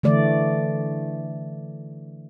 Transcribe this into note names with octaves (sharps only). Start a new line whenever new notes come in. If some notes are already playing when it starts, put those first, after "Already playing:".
D3 E3 A3 D5